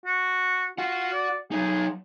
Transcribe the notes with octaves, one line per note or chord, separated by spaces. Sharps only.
F#4
F4 F#4 F#5
D5
F#3 D#4 G#4